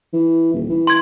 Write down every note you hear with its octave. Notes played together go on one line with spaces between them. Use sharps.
E3
D#1
E3
C6 G#6